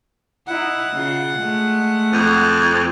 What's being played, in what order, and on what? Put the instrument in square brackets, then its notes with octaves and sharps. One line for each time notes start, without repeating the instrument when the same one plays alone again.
[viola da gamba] D#4 E4 [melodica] F#5
[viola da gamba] C#3 F4
G#3 A3
[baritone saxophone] F2